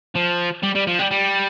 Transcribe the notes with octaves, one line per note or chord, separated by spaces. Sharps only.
F3
G3
G3
F3
G3
G3